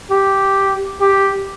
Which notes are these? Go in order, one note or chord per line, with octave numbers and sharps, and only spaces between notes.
G4
G4